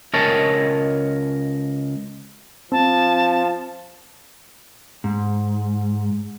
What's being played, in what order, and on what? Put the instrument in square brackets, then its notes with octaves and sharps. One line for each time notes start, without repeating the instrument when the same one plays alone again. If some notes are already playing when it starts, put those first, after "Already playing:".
[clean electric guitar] C#2 A#4 C#5 D#5 A5
[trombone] F3 [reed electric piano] C4 [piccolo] A5
[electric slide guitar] G#2